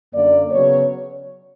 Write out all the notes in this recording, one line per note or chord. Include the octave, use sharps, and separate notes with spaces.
F#2 D3 A#3 D5
C#3 F#3 B3 C#5